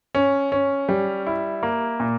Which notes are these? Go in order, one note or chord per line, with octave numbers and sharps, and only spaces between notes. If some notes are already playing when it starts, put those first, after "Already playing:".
C#4
C#4
G3
E4
A#3
A#2